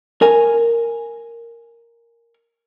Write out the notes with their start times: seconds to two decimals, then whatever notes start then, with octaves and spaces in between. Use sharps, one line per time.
0.22 A#4 G#5